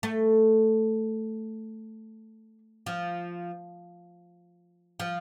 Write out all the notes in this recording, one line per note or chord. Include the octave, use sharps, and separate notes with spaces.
A3
F3
F3